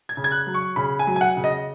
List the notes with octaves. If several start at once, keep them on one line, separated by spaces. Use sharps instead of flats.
G#6
C#3
G#6
F#6
F#3
C#6
C#3 B5
G#5
F#3
G#5
F#5
C#3
D#5